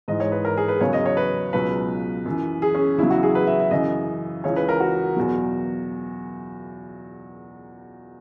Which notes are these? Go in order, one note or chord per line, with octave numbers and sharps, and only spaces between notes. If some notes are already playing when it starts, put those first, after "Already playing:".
G#2 E3 D#5
C#5
B4
A#4
G#4
B4
E2 C#3 F#3 C#5
D#5
C#5
B4
C#2 B2 F#3 B4
F#2 E3
G#4
C#4
E2 C#3 F#3 E4
F#4
G#4
B4
E5
E5
F#2 C#3 E3 D#5
C#2 C#3 E3 C#5
B4
A#4
F#4
E2 B2 F#3